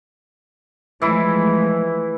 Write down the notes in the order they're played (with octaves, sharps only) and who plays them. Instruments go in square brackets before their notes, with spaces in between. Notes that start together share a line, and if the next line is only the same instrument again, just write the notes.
[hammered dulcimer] E3 E4 [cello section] F3 G#3 A3